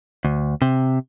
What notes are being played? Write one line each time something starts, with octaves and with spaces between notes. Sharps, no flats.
D2
C3